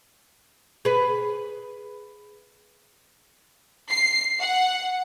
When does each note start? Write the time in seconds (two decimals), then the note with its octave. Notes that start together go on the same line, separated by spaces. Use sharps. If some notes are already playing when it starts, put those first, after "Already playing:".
0.85 G#4 B4
3.91 C7
4.40 F#5